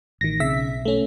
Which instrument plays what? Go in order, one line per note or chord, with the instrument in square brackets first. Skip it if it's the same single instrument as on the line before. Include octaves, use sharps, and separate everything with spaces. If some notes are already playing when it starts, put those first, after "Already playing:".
[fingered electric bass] A1 [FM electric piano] D#3 A#6
[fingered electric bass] B1 C4 [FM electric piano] C#3 E5 B6
[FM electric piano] A3 C#4